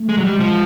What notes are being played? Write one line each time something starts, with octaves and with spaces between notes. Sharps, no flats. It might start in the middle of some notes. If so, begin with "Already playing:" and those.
Already playing: A3
G#3
F#3
G3 G#3
F3